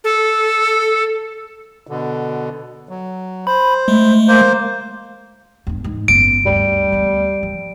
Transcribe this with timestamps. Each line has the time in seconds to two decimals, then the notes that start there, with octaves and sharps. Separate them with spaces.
0.04 A4
1.87 B2 D3
2.89 F#3
3.47 C5 B5
3.88 G#3 A3
4.28 A#3 C5
5.67 E2 G2
5.84 G#2
6.08 F#1 B3 D7
6.46 D2 G2 G3
6.92 D2 B3
7.43 F3